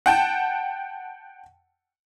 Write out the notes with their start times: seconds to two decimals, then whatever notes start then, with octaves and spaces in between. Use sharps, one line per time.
0.06 F#5 G5 A5